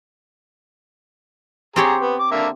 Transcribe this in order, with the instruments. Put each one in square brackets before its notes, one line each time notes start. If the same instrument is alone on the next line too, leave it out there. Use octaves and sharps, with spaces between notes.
[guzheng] C4 G4 C#5 [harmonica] G#4 A#5
[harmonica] B3
D6
D3 A#3 E5